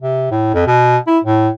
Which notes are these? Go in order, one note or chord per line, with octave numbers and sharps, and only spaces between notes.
C3
A2
F2
B2
E4
A2